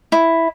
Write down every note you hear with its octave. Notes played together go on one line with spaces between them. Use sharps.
E4